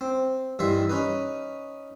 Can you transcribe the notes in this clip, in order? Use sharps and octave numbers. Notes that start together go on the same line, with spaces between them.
C4
G2 D#3 E3 E5 C6
C#4 D#4 B4